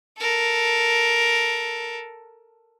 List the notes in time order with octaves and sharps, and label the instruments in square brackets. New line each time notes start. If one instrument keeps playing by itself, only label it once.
[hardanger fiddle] A4 A#4